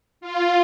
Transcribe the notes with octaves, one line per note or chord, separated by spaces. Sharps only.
F4